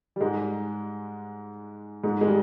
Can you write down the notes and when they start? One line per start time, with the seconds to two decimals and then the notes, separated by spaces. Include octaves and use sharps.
0.16 G3
0.21 G#2 G#3
2.03 G#2 G#3
2.21 G#3
2.27 G3